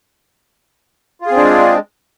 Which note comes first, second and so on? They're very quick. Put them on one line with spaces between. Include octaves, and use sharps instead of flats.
F4 G#4 C4 D4 G#3